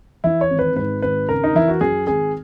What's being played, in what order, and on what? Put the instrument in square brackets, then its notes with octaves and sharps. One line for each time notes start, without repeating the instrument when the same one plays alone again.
[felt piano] E3 [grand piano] E4
[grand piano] C#5
[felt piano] G#1
[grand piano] B4
[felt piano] G#2 [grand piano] B4
[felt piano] G#1 [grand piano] B4
[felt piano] C#3 [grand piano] A#4
[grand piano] D#4
[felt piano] E3 [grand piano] E4
[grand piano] F#4
[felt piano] F#2 [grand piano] G#4
[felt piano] G#1 [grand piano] G#4